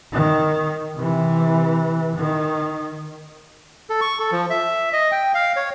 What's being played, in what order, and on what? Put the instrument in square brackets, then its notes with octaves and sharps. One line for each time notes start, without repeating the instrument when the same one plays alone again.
[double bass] D#3
C3 E3
D#3
[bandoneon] A4
C#6
A4
F3
E5
D#5
G5
F5
C#5